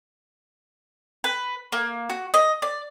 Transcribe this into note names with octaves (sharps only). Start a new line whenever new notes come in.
B4
A#3
F#4
D#5
D5